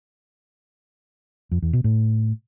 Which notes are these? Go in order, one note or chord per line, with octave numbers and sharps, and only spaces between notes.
F2
E2
B2
A2